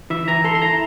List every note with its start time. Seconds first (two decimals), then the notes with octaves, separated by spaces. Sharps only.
0.10 E3 E5
0.28 E3 A#5
0.44 A4 C6
0.55 C6
0.62 E4 A#5